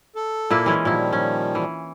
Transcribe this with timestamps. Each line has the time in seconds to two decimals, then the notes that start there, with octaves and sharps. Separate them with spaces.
0.16 A4
0.50 A#2 A#3 E4
0.66 E3 G#3 C#4
0.85 A#2 D#3 F3 G3 E4
1.13 C#4
1.55 E3